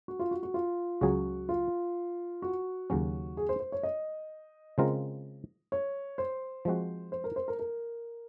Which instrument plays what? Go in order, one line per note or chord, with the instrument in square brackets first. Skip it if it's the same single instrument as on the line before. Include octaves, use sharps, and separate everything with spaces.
[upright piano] F#4
F4
F#4
F#4
F4
[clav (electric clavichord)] C#2 C#3 F#3 C#4 G#4 [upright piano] F#4
[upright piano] F4
F#4
[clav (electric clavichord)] D#2 C#3 F#3 C#4
[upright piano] G#4
C5
C5
C#5
D#5
[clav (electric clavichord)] C#3 G#3 C4 F4 A#4
[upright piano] C#5
C5
[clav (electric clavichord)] F3 G#3 C4 F#4
[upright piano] C5
A#4
C5
A#4
A#4